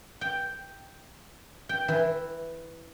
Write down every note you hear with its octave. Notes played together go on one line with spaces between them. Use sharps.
G5
G5
E3